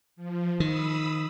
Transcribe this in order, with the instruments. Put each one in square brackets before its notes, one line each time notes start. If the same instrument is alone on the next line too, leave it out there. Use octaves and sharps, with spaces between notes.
[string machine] F3
[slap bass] D#3 [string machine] B5 D#6 E6